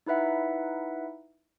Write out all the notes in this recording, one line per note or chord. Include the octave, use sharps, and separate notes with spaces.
D#4 E4 B4 E5 F#5